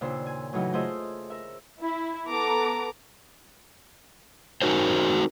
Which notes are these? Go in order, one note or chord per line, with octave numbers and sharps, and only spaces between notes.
D#2 A#2 C#3 D4 C5 E6
G#5
F#2 A2 C#3 E3 F#3 D#4
A3 F4 G#4 C5 D#5 E5
A#4 E5
E4
B3 A4 A#5 D6
C4 D#4 F#4 A#4 C5